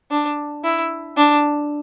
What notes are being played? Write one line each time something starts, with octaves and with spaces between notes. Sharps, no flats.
D4
E4
D4